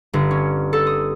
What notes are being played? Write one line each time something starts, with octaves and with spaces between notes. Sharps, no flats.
G1
C#4
A4
D#6